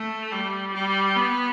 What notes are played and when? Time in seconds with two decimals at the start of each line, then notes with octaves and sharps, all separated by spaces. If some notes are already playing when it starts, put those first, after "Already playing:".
Already playing: A3
0.32 G3
0.74 G3
1.17 B3